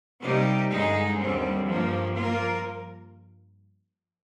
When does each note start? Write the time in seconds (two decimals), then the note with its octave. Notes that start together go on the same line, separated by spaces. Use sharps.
0.22 C3 G3 A#3 D#4 G4
0.72 G2 D3 G#3 D#4 G#4
1.20 D#2 D3 G3 C4
1.70 G2 F3 A#3
2.18 F3 A#3 F4 A#4